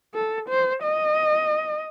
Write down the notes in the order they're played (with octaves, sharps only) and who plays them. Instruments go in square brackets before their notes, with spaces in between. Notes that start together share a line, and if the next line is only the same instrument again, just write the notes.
[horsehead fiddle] A4
C5
D#5